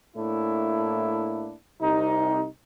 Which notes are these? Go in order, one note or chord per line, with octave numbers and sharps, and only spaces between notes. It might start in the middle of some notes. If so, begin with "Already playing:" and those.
A2 A3 A#3 D4 E4
C2 C3 D#4